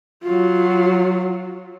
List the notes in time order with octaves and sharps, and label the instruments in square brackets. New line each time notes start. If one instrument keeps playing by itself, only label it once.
[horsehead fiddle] F#3 F4